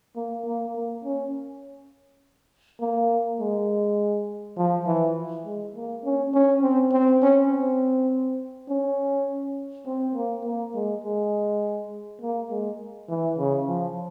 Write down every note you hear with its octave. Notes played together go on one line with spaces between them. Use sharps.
A#3
A#3
A#3
C#4
A#3
G#3
F3
E3
G#3
A#3
C#4
C#4
C4
C4
C#4
C4
C#4
C4
A#3
A#3
G#3
G#3
A#3
G#3
E3
C#3
F3